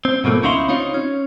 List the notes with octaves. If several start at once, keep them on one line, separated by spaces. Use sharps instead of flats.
C4
G#2 B2 F3 A3 A#3
C#2 C#4 D#4 E4 F5 C6
C4 D#4 F4 C#5
C#4